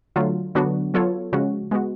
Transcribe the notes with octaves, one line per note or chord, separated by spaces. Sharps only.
D3 F#3 A3 F4
D3 F#3 B3 D4 F#4
F#3 B3 F4 A4 C#5
C#3 F3 G#3 C#4 F#4
G#3 B3 F#4